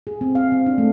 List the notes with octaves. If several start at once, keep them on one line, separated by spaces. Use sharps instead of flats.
G#4
C4
F5
C4
D4
A3